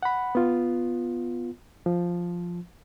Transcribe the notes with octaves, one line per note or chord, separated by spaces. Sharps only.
F#5 B5
B3 F4
F3